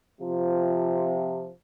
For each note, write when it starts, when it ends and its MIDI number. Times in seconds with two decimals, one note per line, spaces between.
0.21 1.49 48
0.21 1.49 53